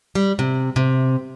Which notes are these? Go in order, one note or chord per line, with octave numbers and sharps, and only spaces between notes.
G3
C3
C3